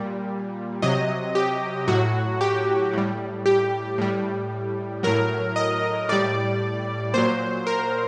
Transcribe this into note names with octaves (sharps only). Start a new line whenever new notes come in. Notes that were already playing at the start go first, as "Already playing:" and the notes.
Already playing: A#2 G3
C3 F#3 D#5
G4
A2 F#3 F#4
G4
A2 G3
G4
A2 G3
A2 F#3 A#4
D#5
A2 G3 D5
A#2 F#3 C5
A#4